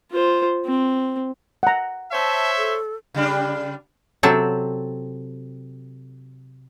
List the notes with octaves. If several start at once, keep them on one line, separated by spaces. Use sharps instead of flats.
F4 C5
C4
F#5 A#5
C5 C#5 E5 A5
A4
C#3 G3 D4
C3 F#3 C4 A4